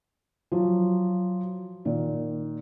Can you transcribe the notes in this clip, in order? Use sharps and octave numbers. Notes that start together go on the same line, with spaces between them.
F3 F#3
A#2 D#3